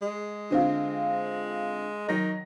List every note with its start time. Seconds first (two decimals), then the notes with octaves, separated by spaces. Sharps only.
0.02 G#3
0.50 D3 C4 F4
2.09 D#3 F#3 A#6